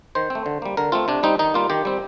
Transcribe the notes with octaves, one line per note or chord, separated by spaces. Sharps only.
D#3 C5
C4
A3
D3
G3 A#3
D3 A#4
A3 C4 F4
C3 D4
G3 C4 D#4
D#3 D#4
G3 A#3 F4
D#3 G4
G3 C4